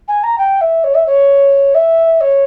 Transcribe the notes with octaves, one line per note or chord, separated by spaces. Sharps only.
G#5
A#5
G5
E5
C#5
E5
C#5
E5
C#5